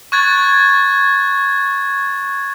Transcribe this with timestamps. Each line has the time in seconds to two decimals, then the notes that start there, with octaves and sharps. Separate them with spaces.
0.12 C#6 F#6 G#6 A6